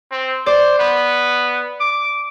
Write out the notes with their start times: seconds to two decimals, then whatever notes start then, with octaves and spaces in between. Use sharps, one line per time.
0.12 C4
0.46 C5 D5
0.79 B3
1.81 D6